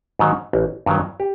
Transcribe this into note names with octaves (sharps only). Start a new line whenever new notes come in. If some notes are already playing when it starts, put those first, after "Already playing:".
G#2 D#3 F#3
A1
G2 D#3 F#3
G4